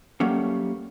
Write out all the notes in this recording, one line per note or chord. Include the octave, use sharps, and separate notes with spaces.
F#3 G3 A3 A#3 C#4